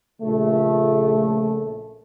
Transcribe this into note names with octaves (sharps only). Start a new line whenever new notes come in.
A#1 C#3 A3